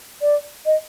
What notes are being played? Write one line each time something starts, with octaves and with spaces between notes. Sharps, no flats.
D5
D#5